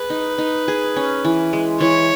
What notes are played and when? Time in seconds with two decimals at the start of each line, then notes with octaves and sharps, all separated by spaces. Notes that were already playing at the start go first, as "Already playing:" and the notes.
Already playing: G#4 B4
0.10 D#4
0.38 D#4
0.68 G#4
0.96 C#4
1.25 E3
1.53 G#3
1.81 E3 C#5